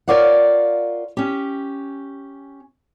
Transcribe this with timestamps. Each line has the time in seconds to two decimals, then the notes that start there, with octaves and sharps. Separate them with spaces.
0.08 F4 A#4 C#5 D5 F5 F#5
1.17 C#4 G4